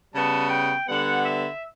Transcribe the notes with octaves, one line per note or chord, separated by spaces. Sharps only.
C#3 G3 B3 A5
G5
D3 G3 B3 F#5
E5